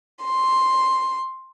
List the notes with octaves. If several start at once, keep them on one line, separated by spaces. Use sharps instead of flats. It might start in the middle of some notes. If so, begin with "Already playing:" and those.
C6